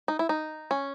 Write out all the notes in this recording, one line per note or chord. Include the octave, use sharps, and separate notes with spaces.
D#4
E4
D#4
C#4